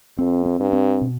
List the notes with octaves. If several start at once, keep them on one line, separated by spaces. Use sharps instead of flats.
F2 C4
C4
G2
C4
B2